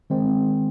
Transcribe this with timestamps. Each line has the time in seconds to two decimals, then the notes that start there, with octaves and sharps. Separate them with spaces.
0.10 D#3 G#3 C4